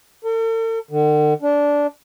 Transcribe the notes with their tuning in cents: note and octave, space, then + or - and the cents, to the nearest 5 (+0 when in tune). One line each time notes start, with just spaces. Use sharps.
A4 +45
D3 +45
D4 -15